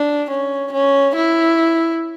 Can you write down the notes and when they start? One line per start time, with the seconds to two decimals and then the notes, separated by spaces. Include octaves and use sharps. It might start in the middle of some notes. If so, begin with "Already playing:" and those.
Already playing: D4
0.31 C#4
0.73 C#4
1.16 E4